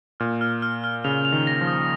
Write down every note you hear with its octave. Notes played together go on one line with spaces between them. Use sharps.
A#2 F6
F6
F6
F6
C#3 F7
F7
D#3
A#6
F3
D#6